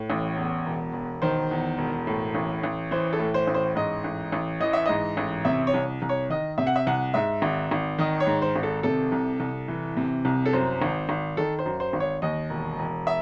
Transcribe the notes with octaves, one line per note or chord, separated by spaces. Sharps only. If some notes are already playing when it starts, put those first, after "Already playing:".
Already playing: A2
A1
E2
E1
E1
D#3 C5
E2
E1
A2
A1
A1
E3 C5
A4
A2
C5
A1
C5
G#2 D#5
A1
A1
E3 D#5
E5
G#2 D#5
A1
C3 E5
C#5
C2
C2
C#5
D#3 D#5
C3 E5
F#5
E5
C2 F#5
G#2 E5
G#1
G#1
D#3 D#5
C#5
G#2
C5
G#1
A4
C3 A4
C2
C2
E3
C3
C2
A4
F#2 C5
G#1
G#1
D#3 A4
C5
F#2
C5
G#1
C#5
D#2 D#5
E1
E1
E5